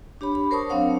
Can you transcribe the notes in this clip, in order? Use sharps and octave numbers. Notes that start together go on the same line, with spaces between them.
D4 G4 C#5 B5
B5
A#4 C5 C#5 A5 C#6 D#6
F#3 C4 D4 C#5 F5 F#5